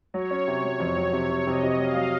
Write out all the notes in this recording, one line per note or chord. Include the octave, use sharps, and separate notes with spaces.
F#3 C#5
C#4
C3
F#3
F2
F#3
C3
C3
C3 D#5
C3
F#3 F5
F#3